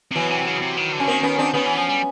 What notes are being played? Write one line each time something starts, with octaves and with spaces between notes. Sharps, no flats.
C3
B2 E3 F#3
C3
C#3
B2
C3
D#3
D3
C#4
D#3 A#3 C4
B3 C#4
C4 D4
D#3 B3 C#4
E3
F3
G3